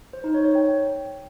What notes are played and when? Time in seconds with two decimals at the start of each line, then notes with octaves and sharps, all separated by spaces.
0.13 C5
0.24 D#4
0.34 C#5
0.45 C#5
0.55 G5